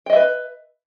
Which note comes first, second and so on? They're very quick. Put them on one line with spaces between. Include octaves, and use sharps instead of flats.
G5 D#5 E5 B4